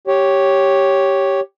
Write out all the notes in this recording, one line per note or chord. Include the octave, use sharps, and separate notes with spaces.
G4 C#5